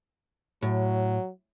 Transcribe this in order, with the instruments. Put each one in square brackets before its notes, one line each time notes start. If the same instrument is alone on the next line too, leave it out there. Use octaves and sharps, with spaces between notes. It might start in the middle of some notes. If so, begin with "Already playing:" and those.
[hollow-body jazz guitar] A2 [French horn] F#3